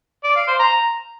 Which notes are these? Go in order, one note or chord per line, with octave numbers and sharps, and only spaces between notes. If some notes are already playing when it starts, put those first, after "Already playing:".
D5
F5
C5
A#5